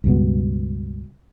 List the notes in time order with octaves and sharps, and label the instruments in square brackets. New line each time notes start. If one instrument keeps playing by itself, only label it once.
[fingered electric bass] C#2 G2 B2